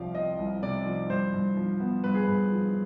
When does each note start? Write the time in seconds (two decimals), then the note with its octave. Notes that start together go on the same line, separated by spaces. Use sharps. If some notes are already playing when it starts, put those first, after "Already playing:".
Already playing: C2 C3 F3 D5 F5
0.15 C4 D#5
0.38 C2
0.63 C3 D5
0.86 F3
1.09 G2 C5
1.33 G2
1.57 F3
1.80 B3
2.04 G2 B4
2.14 G#4
2.24 G2 B4
2.52 F3